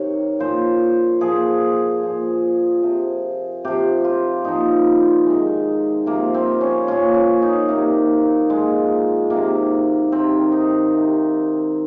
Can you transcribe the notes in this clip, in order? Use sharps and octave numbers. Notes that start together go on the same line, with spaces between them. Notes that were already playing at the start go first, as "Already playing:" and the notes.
Already playing: C3 D#3 C#5
A#2 F3 C5
A#2 F3 G#4
A#2 F3
C3 F3
C3 F3 G4
F4
A#2 F3 D#4
C3 D#3 G#3
C3 F3 A#3
C4
C#4
A#2 F3 C#4
C#4
D#4
C3 D#3 A#3
A#2 F3 G#3
C3 D#3 A#3
C3 D#3 C4
D#4
C3 D#3